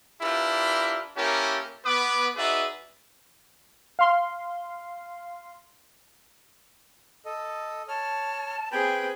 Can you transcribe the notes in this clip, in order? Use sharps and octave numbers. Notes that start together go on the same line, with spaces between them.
D4 E4 F4 G4 A#4 B4
A#3 C#4 E4 G4 A4 A#4
B3 B4 D6
D#4 F#4 G#4 B4 D5 E5
F5 C6
A4 D#5
C#5 A5 F6
C4 G#4 B4 G5 G#5 B5